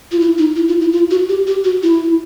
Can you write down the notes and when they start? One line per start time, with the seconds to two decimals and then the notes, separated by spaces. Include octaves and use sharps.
0.12 F4
0.20 E4
0.38 D#4
0.56 E4
0.68 F4
0.81 E4
0.93 F4
1.11 F#4
1.29 G4
1.47 G4
1.64 F#4
1.83 E4